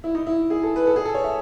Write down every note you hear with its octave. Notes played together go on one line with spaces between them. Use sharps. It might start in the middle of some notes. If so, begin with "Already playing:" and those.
E4
D#4
E4
G#4
A4
B4
A4
G#4
A4
C#5
E5